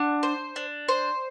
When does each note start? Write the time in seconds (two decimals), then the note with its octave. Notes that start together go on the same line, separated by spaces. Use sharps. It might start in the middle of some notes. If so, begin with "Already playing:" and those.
Already playing: D4 F#5
0.23 C5
0.56 D4
0.88 C5